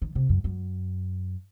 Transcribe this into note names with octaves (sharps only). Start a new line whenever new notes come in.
D#3
C3
F#2
F#2